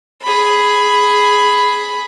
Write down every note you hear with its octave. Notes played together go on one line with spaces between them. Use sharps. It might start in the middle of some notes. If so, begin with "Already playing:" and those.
G#4 B5